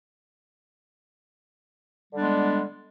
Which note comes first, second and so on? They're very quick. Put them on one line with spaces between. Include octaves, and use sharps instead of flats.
G3 D3 D4 B3 G#3